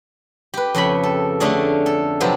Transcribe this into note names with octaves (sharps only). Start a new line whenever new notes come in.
G4 B4
F2 C#3 C#5 B5
A4
D3 A3 C#4 G#4 D5
A4
C3 F3 F#3 B3 G4 G#4